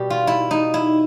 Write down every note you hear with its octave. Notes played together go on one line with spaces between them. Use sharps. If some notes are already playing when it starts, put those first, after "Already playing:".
Already playing: B2 G3 G4
F4
E4
D#4
E4